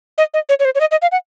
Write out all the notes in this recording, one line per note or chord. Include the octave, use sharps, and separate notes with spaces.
D#5
D#5
C#5
C#5
C5
C#5
D#5
D#5
F5
F#5